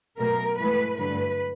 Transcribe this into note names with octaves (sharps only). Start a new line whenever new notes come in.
B2 F#3 A3 A#4
G#2 E3 A3 B4
G2 D3 F#3 A3 B4